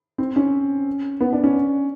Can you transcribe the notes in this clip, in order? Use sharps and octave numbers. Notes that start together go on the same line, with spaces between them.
C4
C#4
B3
D4
C#4